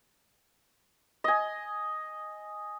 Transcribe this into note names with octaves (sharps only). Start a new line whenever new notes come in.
D#5 G#5